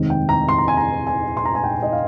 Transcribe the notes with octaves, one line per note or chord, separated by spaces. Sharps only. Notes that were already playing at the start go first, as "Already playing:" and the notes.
Already playing: F1 D#2 D#3 G#3 C4
G5
A#5
C6
A#5
G#5
A#5
G#5
C6
A#5
G#5
G5
D#5
F5